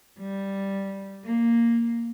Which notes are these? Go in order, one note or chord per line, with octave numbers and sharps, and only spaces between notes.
G3
A#3